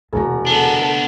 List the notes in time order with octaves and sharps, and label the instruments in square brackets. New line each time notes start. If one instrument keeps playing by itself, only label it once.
[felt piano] E1 F#4 A#5 [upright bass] D2 C3
[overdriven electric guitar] B3 D4 [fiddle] A4